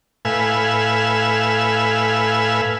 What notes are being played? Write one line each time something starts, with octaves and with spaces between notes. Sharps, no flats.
A2 B4 F5 G#5 E6